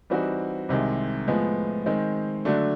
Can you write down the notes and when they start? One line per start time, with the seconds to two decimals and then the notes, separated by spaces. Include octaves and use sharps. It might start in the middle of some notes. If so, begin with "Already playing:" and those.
0.10 E3 G3 C4 D#4 F#4
0.69 C2 C3 D#3 G#3
1.28 A2 F3 G#3 B3
1.86 D#3 G#3 C4
2.45 D3 F#3 A3 D4